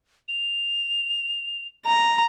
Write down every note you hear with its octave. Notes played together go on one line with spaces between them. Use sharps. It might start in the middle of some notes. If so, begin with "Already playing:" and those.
F7
A#5